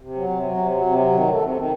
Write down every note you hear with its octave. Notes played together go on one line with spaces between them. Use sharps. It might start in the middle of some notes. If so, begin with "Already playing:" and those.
C3
F#3
C3
F#3
C3
F#3
C3
F#3
D#3
A3
C3
D#3